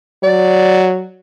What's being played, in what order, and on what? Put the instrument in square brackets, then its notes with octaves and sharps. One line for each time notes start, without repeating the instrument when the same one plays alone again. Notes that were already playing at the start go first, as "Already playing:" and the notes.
[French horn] F#3 [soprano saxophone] D5